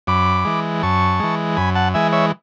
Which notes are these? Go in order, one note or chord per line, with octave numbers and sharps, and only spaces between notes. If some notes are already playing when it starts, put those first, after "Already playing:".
F#2 B5 D6
E3 G#3
F#2 A5 C#6
E3 G#3
F#2 G#5 B5
F#5 A5
E3 G#3 E5 G#5
C#5 E5